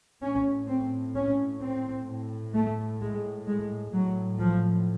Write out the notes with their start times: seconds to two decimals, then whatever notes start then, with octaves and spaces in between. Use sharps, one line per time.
0.22 A2 C#4
0.68 C4
1.16 C#4
1.61 C4
2.08 A2
2.54 A3
3.01 G#3
3.48 G#3
3.93 A2 F#3
4.40 F3